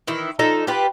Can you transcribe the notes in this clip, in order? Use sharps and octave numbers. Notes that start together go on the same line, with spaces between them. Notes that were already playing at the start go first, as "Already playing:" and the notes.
D#3 E3 E4
F3 D#4 A4
F4 G4 B4